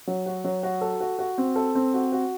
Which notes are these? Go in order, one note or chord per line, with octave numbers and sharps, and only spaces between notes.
F#3
F#4
F#3
F#4
A4
F#4
F#4
C4
A4
C4
F#4
F#4